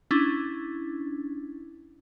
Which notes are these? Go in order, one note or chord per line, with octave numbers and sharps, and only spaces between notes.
C#4 D4 E4